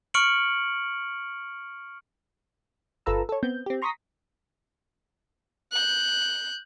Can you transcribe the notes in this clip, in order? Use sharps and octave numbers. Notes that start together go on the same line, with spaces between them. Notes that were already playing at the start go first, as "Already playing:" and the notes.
C#6 F6 C#7 D7 F#7
G1 F4 A4 B4 A#5 E6
A4 C#5
B3 C4 G6
C4 G4
A#5 C6 C#6 D#6 A#6 B6
F#6 G6